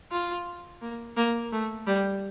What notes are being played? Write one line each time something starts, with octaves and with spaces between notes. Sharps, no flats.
F4
A#3
A#3
A3
G3